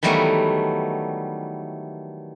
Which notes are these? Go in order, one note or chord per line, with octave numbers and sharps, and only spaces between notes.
D#3 E3 F#3 G3 A3 B3